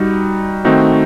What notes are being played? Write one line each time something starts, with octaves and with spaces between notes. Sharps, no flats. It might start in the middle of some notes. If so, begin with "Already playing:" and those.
Already playing: G3 D#4 F#4
D#3 A3 C4 D#4 F#4